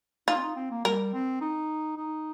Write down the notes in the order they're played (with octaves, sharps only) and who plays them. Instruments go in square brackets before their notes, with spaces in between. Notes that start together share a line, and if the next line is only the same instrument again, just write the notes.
[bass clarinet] D#4 [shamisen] F4
[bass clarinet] C4
D#4
C4
A#3
[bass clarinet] G3 [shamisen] A#4
[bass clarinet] C4
D#4
D#4